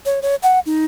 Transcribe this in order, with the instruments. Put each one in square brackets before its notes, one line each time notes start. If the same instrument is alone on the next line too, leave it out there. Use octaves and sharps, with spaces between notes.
[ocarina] C#5
C#5
F#5
D#4